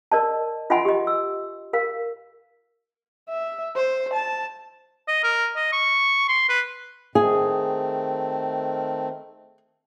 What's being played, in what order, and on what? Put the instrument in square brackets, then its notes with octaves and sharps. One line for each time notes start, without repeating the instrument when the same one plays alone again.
[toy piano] A#4 D5 D#5 A5
F4 D#5 E5 F#5 G#5 C6
G4 D#5
E6
A#4 F5
[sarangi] E5
C5
A5
[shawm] D#5
A#4
D#5
C#6
C6
B4
[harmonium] D#3 A3 C4 [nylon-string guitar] G#4